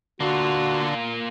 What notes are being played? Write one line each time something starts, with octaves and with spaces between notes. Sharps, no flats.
D3 A#3 F4 F#4